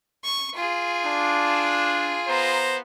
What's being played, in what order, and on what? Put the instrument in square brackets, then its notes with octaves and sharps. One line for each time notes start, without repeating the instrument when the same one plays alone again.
[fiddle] C#6
F4 G#4
[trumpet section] D4
B3 C5 A#5